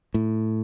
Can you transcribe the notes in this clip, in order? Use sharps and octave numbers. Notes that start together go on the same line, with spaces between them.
A2